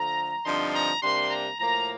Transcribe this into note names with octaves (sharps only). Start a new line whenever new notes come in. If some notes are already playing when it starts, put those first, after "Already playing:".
Already playing: D3 F3 A3 A#5
G2 D3 F3 C4 D#4 C6
A#5
C3 G3 A#3 D4 C6
A#5
A2 F3 A#3 A#5